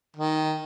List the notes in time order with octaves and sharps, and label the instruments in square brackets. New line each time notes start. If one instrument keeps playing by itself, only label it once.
[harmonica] D#3